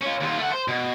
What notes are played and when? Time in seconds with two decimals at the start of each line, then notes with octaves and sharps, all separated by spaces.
0.01 C#4 F4
0.20 D#2 F4
0.38 A3 F#5
0.52 C5
0.68 B2